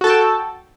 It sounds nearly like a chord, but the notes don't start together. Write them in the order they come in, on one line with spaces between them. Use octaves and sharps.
F#4 A4 A5 G5